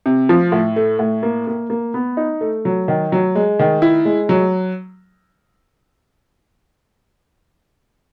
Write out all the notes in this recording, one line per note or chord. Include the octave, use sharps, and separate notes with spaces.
C3
F3
A2
A3
A2
A#3
A#3
A#3
B3
D#4
A3
F#3
D#3
F#3
G#3
D#3
E4
G#3
F#3